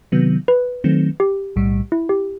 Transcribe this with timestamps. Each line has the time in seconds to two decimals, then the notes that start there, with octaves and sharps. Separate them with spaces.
0.12 C3 D#3 F#3 B3
0.48 B4
0.84 D#3 F#3 A3 C4
1.20 G4
1.56 B1 A2 G3
1.92 E4
2.09 G4